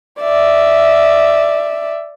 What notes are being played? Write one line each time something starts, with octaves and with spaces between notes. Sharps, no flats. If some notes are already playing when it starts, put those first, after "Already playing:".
D5 E5